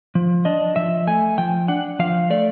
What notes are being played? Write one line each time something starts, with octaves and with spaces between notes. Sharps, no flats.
F3
D4 D#5
F3 E5
A3 G#5
F3 G5
D4 F#5
F3 F5
A3 D5